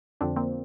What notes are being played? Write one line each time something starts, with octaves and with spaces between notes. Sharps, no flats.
F2 D3 F3 C4 D4
A#3 C4